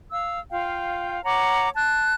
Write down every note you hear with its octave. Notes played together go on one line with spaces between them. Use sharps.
F5 E6
F4 F5 G5
C#5 F#5 A#5 D6
A5 F#6